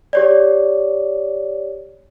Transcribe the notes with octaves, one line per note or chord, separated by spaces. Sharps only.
G4 C#5 D5